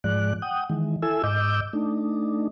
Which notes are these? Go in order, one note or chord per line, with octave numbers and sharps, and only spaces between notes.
G#2 F3 G#3 D5 F#6
F#5 G5 D#6
D#3 E3 G#3
E4 A4 G#5 E6
G#2 D#5 D6 E6 G6
A3 D4 D#4